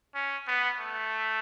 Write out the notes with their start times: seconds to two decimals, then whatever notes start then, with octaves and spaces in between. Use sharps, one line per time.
0.15 C#4
0.48 B3
0.80 A3